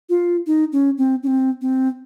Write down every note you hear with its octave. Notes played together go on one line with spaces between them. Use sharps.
F4
D#4
C#4
C4
C#4
C4
C4